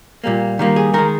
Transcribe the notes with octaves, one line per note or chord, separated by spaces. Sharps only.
A#2 G3 A#3
D#3 G3 A#3
G#4
D#3 G#3 A#4